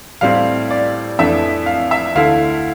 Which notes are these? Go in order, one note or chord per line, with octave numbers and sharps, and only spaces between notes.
A2 G3 C4 E4 F5
D5
F2 E3 A3 D4 E5
F5
E5
D2 D3 A3 E4 F5